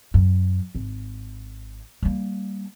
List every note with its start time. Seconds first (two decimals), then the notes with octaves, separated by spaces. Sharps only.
0.14 F#2
0.75 G#1
2.03 G3 A#3